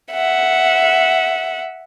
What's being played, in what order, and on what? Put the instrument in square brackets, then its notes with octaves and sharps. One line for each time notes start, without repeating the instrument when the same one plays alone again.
[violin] E5 F#5